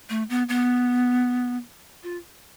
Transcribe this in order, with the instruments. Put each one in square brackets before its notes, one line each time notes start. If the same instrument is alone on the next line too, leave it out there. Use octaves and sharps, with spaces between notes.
[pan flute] A3
B3
B3
F4